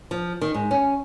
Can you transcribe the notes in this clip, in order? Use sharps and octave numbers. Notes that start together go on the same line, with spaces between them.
F3
D#3
G#2
C#4